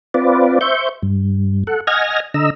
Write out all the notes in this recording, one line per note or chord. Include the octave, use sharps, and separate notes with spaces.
C4 F4 B4 D5
C5 E5 C#6 G6
G2
A4 F#5
D#5 F#5 G#5 F6 G#6 A#6
D3 D#5 A#5 E6